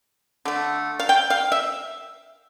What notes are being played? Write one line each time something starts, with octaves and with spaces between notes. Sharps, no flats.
D3 A3
F5
G5
F5
E5